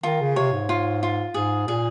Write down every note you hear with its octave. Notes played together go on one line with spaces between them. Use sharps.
D#3 F4
C#3
C3 C#5
G#2
F4
F4
G#2 G#4
A#2 G#4